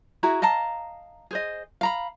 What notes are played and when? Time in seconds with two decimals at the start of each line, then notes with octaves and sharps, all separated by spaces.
0.23 E4 F#4 G#4 A#5
0.42 D#5 F5 A5 A#5
1.31 G#4 C5 D#5
1.81 F5 A#5 B5